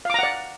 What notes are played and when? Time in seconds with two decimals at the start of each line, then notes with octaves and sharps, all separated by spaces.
0.05 F5
0.10 D6
0.14 A#5
0.19 F#5
0.23 D5